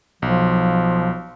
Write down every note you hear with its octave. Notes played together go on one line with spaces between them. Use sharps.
B1 F3